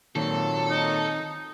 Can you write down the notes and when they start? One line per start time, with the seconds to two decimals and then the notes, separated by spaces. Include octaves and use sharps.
0.16 A#2 D#3 F#3 C4 A4
0.70 D#4